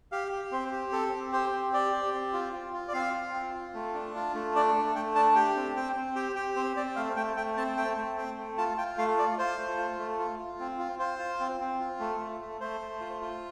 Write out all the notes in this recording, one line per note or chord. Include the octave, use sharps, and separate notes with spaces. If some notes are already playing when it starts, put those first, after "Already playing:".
G4 F5
G4
C4 C5
G4
C4 A4
C4
G4 C5
C4
G4 D5
G4
C4
F4
F4
F4
D5
C4 F5
F4
C4
F4
A3
D4
F4
A3
D4 D5
A3
A3 G5
D4 A5
G4 G5
C4
C4 G5
C4
G4 G5
G4 G5
C4 C5
C4 D5
A3 F5
A3 G5
A3 G5
C4 A5
A3 G5
A3
C4 G5
A3
F4 A5
F4 G5
A3 F5
F4 D5
F4 C5
A3
F4
A3
F4
F4
C4
F4
F4 C5
F4
C4
C4
F4
A3
A3
A3
A3 C5
A3
F4
F4